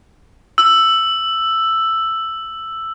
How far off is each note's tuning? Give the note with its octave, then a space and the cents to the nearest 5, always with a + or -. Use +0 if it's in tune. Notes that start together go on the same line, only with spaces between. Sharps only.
E6 +5